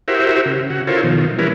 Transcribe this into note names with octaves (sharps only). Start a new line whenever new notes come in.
E4 F#4 G4 A#4 C5 E5
C#3
C#3 F#4
E4 F4 A4 A#4 C5 C#5
B2 D#3 F3
E3 G3 C#4 E4 A#4 B4